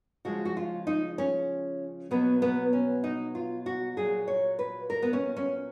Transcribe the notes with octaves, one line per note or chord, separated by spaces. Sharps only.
C#3 F3 G#3 F#4
F#4
F4
D#4
C#4
B2 F#3 B3
B3
C#4
D#4
F4
F#4
A#2 F#3 G#4
C#5
B4
A#4
B3
C#4
C#4